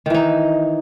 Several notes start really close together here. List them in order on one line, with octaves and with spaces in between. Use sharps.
D#3 E3 D#4